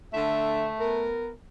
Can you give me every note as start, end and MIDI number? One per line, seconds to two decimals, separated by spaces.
0.14 0.70 50
0.14 1.14 57
0.14 0.70 76
0.80 1.31 59
0.80 1.31 70